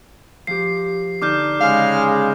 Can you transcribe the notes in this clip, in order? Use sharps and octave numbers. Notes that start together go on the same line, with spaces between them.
F3 G4 C7
D3 D#4 D6 F6 G6
C#3 G#3 F5